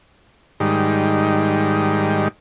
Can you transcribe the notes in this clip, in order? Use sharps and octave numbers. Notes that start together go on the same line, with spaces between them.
G#2 D#3 G3